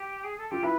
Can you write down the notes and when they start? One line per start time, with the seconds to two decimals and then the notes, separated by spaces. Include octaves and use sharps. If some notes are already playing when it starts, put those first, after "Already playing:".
Already playing: G4
0.23 G#4
0.37 A4
0.50 F4 G4
0.63 E4 B4